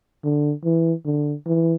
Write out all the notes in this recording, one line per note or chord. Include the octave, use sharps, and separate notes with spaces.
D3
E3
D3
E3